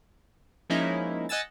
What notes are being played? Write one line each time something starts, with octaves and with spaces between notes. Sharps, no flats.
F3 G#3 A#3 C#4 D#4 E4
D#5 F#5 G#5 E6 A6